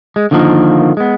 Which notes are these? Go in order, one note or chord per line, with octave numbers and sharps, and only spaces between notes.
G#3
D3 D#3 F3 G#3 A#3
G#3 B3